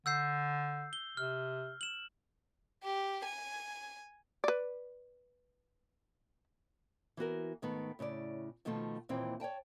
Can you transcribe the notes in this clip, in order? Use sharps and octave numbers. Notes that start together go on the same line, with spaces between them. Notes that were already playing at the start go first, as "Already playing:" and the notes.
D3 E6 G6 C7
G7
C3 F6
E7 F#7
G4
G#5
B4 D5
E3 B3 F#4 A#4
G#2 D#3 A3 B3
A2 C#3 E4 D5
B2 D#3 F3 A3 F4
D#2 A#2 E3 C4 E4 G5
C#5 D5 G5 A5